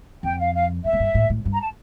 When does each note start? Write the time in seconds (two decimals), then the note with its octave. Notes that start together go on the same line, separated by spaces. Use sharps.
0.23 F2 G5
0.39 F5
0.53 F5
0.84 G2 E5
0.93 A2
1.00 G2
1.15 A2
1.30 A2
1.45 G2
1.52 A#5
1.60 A5